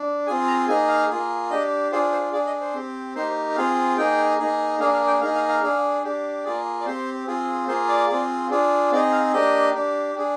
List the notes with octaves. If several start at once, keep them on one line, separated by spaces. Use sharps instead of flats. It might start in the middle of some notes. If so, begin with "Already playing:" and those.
Already playing: D4
C4 F4 G#4 G#5
A#5
A#3 D#4 G#4 G#5
F5
A#3 F4 G#4
D4 G4 D#5
D4 F4 G#4 C5
C5
D4 G#4 D5
D#5
C5
C4 G4
A#3 D#4 G4 C5
C4 F4 G#4 F5
A#3 D#4 G#4 G5
A#3 D#4 G#4
A#3 D4 G#4 F5
F5
G5
A#3 D#4 G#4 F5
F5
F5
D4 G#4
D4 G4
A#3 F4 G#4 D5
D5
C4 G4 C5
C4 F4 G#4
A#3 F4 G#4 C5
D5
C4 F4 G#4
D4 F4 G#4
C4 D#4 G#4 D5
F5
A#3 D4 G4 D#5
D4 G4
D4 G#4